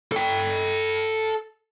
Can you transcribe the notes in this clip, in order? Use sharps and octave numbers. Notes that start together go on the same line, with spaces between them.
A4 G5